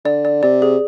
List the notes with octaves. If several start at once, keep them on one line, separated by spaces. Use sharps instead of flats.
D3 D5
D5
C3 D5
G#4